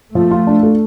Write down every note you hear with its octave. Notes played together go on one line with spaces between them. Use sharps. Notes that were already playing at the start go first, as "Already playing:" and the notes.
F3 A3
F4
D4
A3